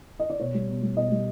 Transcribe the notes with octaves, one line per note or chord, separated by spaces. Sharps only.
D#5
D5
B2 C#5
G3
B2
G3
B2 D#5
G3